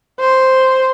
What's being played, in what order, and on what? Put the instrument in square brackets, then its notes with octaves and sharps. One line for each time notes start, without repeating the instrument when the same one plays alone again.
[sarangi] C5